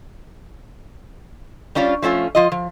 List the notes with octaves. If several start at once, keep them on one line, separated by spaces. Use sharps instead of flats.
G3 C#4 D4 F4
F3 A3 C#4 F4
F3 F4 D#5
F3